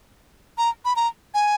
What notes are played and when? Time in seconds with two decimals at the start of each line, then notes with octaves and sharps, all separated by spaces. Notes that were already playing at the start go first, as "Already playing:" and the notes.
0.58 A#5
0.85 B5
0.96 A#5
1.34 G#5